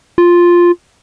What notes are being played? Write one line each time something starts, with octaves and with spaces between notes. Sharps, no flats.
F4